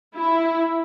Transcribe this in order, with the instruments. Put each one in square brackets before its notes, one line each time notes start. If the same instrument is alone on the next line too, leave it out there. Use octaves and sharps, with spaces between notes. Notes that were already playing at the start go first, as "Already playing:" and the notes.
[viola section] E4